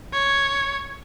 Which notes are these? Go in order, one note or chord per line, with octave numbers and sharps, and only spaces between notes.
C#5